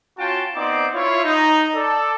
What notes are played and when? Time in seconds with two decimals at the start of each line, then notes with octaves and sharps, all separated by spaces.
0.18 C#4 F4 F#4 G5 A5
0.56 B3 C4 D#4 C5 D5 D6
0.94 E4 F4 C#5
1.24 D#4
1.75 A4 D5